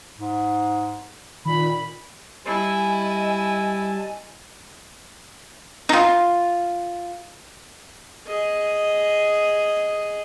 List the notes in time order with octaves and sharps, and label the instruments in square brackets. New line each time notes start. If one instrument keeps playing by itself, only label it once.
[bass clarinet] G#2
[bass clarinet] A#2 [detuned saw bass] D#3 [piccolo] B5
[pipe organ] G3 A5 [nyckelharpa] E4 [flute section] D#5 G#5
[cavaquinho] D#4 F4
[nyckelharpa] G#4 D#5